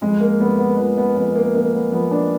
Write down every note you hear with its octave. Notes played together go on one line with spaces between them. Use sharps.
F2 G#3
A#3
F2 B3
B3
F3 B3
B3
F2 B3
A#3
F2 A#3
B3
F3 B3
D4